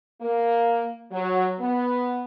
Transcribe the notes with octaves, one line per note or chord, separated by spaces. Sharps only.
A#3
F#3
B3